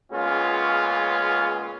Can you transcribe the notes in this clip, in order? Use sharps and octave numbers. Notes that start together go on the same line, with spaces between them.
A#2 C#3 G#3 B3 C#4 F4